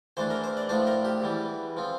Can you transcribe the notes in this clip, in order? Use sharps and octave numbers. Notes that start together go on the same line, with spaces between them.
E2 E3 A3 D4 C5
A#4
C5
D5
A2 F3 A3 D4 C5
A#4
G4
E2 E3 G3
F3 C4